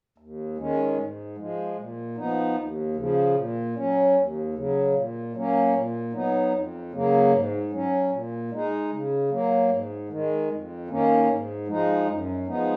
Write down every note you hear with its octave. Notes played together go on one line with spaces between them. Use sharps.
D#2
D#3 G#3 C#4
G#2
F3 G#3
A#2
F3 B3 D#4
D#2
C#3 F3
A#2
F#3 C#4
D#2
C#3 F#3
A#2
F#3 A#3 C#4
A#2
F#3 B3 D#4
F2
C#3 F#3 A#3
G#2
F#3 C#4
A#2
G#3 D#4
C#3
F#3 A#3
G#2
D#3 G#3
F2
D#3 A#3 C#4
G#2
F3 G#3 D#4
F#2
F3 G#3 B3 D#4